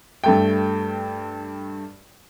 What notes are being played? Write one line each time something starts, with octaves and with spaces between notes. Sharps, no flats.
G2 A3 G5